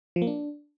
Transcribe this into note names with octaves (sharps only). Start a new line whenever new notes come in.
F3
A#3
D4